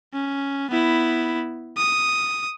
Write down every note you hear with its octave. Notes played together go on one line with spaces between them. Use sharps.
C#4
B3 E4
D#6